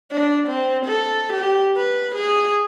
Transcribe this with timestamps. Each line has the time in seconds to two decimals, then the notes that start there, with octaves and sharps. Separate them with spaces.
0.11 D4
0.48 C4
0.85 A4
1.33 G4
1.77 B4
2.15 G#4